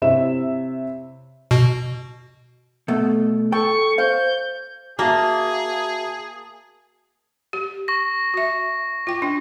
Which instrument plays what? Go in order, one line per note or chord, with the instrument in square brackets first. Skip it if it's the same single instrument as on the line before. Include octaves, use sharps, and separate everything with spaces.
[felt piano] C3 E4 C#5 E5 E7
[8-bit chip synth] B2
[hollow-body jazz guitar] B2 A3
[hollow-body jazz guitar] A4 G5 [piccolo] C#6
[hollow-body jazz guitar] C5 F5 [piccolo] G6
[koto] A#3 [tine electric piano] F#4 E5 [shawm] G#4 [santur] A5
[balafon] G4
[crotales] C#6 A#6
[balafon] F#4 E5
F4 G5
D4